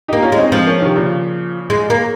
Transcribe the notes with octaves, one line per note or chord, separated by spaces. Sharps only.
A#3 D#4 G4
C#4 F4
G#3
C4 D#4
F3 G#3 C4
A#3 C#4
C3 D#3
A#2 C#3
G#3
A#3